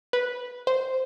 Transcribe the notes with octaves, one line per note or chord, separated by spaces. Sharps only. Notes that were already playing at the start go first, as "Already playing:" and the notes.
B4
C5